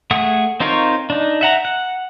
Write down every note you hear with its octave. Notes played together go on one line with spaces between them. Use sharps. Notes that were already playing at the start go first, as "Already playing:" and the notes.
A3 G#4 F#5 D#6
C4 D#4 F4 A#4 C#5
D4 D#4
E5 F#5 A#5
F#5